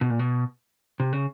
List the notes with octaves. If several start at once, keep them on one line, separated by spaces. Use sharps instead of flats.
B2
A#2
B2
C3
C#3